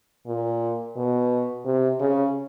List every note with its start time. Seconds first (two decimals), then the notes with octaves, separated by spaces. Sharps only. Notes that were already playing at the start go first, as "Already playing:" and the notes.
0.27 A#2
0.96 B2
1.65 C3
2.00 C#3